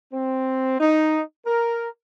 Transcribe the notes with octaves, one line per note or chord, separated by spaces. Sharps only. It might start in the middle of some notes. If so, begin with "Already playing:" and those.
C4
D#4
A#4